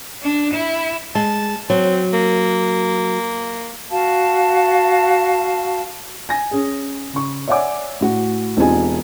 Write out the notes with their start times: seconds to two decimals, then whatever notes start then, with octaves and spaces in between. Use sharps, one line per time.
0.22 D4
0.53 E4
1.15 G#3 A5
1.70 F#3 C4
2.13 A#3
3.90 F#4 F5 A5
6.29 G#5 A#6
6.51 C#4 G#4
7.13 C#3 C#6
7.47 C#5 D5 E5 F#5 G#5 D6
8.01 A2 F#4
8.57 E1 C4 D#4 F4 G4 G#5